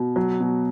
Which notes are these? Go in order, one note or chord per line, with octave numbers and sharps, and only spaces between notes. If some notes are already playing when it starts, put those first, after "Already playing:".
Already playing: B2
F#3
B2